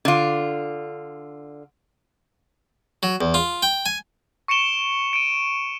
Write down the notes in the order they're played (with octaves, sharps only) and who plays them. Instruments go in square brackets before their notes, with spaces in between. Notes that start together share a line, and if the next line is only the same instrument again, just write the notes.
[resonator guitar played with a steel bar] D3 F4
[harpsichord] F#3
E2
F4
G5
G#5
[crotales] C#6 C#7 D7 E7 G7
D7 D#7